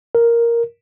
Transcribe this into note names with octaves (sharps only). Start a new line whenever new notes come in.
A#4